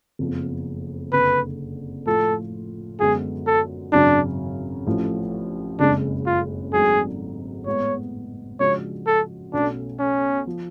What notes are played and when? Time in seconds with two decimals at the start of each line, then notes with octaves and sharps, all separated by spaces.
0.19 F#1 F2 F3 B3
1.13 F#1 F2 D3 B4
2.06 A2 F3 A3 F4 A4
3.00 F#2 D3 G#3 B3 F#4 G#4
3.47 A4
3.92 G#1 F#2 C#3 F#3 D4
4.87 A1 A2 F3
5.79 F#1 F2 C#3 G#3 D4
6.26 F4
6.73 G#1 G#2 F#3 A3 D4 G#4
7.66 A2 G#3 B3 C#5
8.59 C#3 F3 G#3 D4 F#4 C#5
9.07 A4
9.53 B1 B2 A3 C#4 D4 F#4
9.99 C#4
10.47 F3